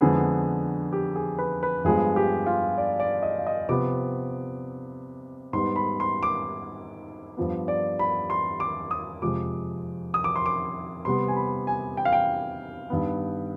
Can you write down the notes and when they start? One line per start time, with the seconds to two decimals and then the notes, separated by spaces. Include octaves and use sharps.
0.01 F2 D3 G#3 B3 G#4
0.93 G4
1.15 G#4
1.38 B4
1.63 B4
1.85 G2 F3 G#3 B3 G#4
2.16 G4
2.46 F4
2.78 D5
3.00 D5
3.23 D#5
3.38 F5
3.47 D#5
3.69 C3 F3 B3 D6
5.53 G#2 G3 B3 C6
5.76 B5
6.00 C6
6.23 D6
7.37 G2 F3 B3
7.68 D5
7.99 B5
8.30 C6
8.60 D6
8.91 D#6
9.22 F2 C3 F3 G#3 D6
10.14 D#6
10.24 D6
10.36 C6
10.46 D6
11.05 C3 G3 B3 C6
11.28 G#5
11.36 B5
11.67 G#5
11.97 G5
12.05 F5
12.13 G5
12.90 G2 D#3 B3